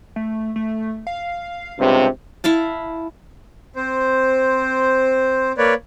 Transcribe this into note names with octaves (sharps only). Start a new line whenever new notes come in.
A3
A3
F5
C#2 G2 C3
E4 E5 F5 A5
C4 C5
A#3 B4 C#5 D5